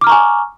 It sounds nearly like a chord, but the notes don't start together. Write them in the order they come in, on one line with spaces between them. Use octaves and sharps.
D6 F6 A#5 C#6 G#5